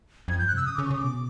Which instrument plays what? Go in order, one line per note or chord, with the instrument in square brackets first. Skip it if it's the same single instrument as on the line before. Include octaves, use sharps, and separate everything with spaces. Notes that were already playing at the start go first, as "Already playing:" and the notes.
[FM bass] F2 [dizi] G#6
[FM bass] G2 [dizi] G6
[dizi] F#6
[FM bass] C3 [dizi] E6
[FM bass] C#3 [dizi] D#6
[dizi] D6
[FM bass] C#3
[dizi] C#6
[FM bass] C#3 [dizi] D#6
[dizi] D6
[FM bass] B2